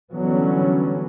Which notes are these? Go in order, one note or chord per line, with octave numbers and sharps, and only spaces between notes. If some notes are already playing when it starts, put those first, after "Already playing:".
D3 E3 F#3 G3 B3 C#4